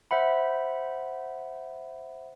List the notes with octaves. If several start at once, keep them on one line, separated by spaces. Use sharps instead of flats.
C5 E5 F#5 B5